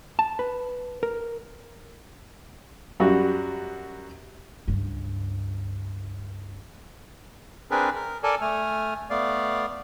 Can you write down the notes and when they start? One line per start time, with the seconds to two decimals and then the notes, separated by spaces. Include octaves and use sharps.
0.19 A5
0.39 B4
1.03 A#4
3.00 F#2 G3 F#4
4.68 C#2 G2
7.71 C4 D4 G#4 A#4 B4
7.95 A#4
8.23 A4 A#4 D5 G#5 A5
8.41 A3 G#5 F6
9.10 A3 B3 D5 F5